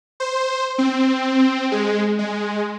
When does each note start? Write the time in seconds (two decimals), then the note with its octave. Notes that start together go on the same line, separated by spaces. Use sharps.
0.20 C5
0.78 C4
1.72 G#3
2.19 G#3